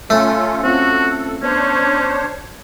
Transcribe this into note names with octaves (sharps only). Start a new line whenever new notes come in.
A3 C#4 F4 A4
C4 C#4 F4 F#4 A4
B3 C#4 D4 C5 C#5